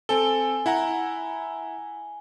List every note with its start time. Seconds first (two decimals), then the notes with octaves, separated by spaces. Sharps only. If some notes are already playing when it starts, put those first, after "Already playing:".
0.09 C4 A4 G#5 G7
0.66 E4 F#5 A#5